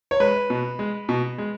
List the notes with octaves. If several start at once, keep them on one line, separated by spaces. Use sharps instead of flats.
C#5
G#3 B4
B2
G#3
B2
G#3